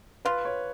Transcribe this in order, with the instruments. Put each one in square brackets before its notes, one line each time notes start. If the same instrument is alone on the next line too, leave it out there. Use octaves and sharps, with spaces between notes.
[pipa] F4 [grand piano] B4
[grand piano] C#5